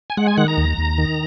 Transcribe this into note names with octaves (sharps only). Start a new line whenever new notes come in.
G#5
G#3 F#5
G#5
D#3 F#5
A#5
D#2
D#2
D#3